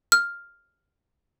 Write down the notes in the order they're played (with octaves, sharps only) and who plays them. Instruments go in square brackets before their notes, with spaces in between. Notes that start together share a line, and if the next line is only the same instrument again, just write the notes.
[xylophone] F6